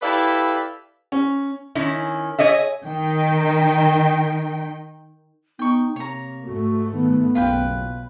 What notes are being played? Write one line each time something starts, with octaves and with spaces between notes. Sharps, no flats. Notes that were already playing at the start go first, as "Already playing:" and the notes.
E4 G4 A4 B4 D5 F5
C#4
D#3 C#4 E4
G#4 C#5 D#5 E5
D#3 G5
B3 D#4 G5 C#6
C3 A#3 C#5 A#5
G#2 A3 F#4
D#3 B3
F#1 B1 F4 B4 G5